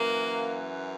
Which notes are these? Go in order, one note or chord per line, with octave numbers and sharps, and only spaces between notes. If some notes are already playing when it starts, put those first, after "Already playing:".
Already playing: F#2 E3 A#3